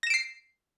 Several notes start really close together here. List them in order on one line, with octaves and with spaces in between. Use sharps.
A#6 E7 D7 C7